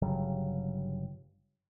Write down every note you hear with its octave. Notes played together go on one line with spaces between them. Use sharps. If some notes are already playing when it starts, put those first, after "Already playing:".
G1 C#3 F#3 G3